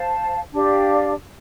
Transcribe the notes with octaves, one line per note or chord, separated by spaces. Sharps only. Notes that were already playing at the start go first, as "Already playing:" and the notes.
Already playing: C5 F5 A5
D4 G4 D5 F5